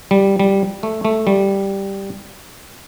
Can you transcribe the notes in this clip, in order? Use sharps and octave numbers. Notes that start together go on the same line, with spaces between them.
G3
G3
A3
A3
G3